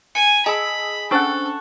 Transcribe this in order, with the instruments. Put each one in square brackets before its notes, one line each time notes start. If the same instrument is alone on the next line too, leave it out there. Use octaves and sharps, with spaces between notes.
[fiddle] G#5 [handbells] C#7
[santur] G#4 E6 [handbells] D#5 G#5 A5 [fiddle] B5
[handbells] C#4 D4 C5 [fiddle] A4 [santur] F#5 A5 C#6